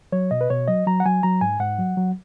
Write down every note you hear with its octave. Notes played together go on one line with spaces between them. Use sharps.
F#3 C#5
B2 D#5
B4
B2 C#5
F#3 D#5
F#3 A#5
F#5
F#3 G#5
F#3 A#5
G#2 G#5
G#2 F#5
F#3
F#3